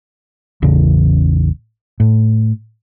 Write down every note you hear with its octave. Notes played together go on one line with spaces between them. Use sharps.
A1 E2 C#3
A2